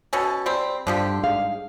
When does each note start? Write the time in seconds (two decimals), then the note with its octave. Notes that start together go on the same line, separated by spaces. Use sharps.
0.13 B2 C#4 A4
0.46 G3 C4
0.87 G2 D3 F3 G4
1.23 G#2 G#4 F5